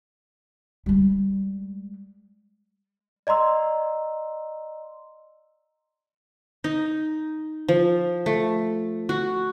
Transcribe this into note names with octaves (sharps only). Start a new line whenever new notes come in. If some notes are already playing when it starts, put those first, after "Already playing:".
G3 G#3
D5 D#5 A#5 C6 E6
D#4
F3
A3
F#4